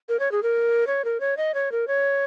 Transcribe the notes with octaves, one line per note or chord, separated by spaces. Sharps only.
A#4
C#5
G#4
A#4
C#5
A#4
C#5
D#5
C#5
A#4
C#5